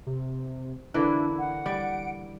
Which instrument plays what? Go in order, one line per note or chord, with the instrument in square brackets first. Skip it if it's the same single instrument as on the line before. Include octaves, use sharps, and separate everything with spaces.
[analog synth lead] C3
[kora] D3 E3 A#3 [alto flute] D4 [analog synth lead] E4
[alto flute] F#5
[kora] G3 [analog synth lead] D7